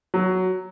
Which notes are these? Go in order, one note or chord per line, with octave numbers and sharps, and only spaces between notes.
F#3